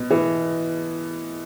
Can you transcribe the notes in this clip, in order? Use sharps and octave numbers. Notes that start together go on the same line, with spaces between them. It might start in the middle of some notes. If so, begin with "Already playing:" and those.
Already playing: B2
E3